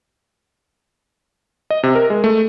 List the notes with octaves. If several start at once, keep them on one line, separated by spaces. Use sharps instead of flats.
D#5
C3
A#4
G#3
A3